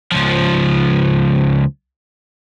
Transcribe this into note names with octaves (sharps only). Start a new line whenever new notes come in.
C#2 F3